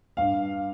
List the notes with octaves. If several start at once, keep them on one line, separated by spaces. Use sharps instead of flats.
G2 F5